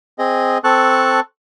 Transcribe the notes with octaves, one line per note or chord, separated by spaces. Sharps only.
C4 G#4 D#5
C4 A4 A5 C#6 F#6